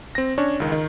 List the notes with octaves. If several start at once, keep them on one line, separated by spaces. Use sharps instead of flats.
C4 A#6
C#4 D4 C#5
C#2 D#3
D#3